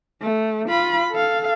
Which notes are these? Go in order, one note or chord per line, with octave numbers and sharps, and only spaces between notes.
A3
F4 B5
A4 F5